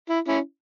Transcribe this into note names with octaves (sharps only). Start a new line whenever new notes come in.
E4
C#4 E4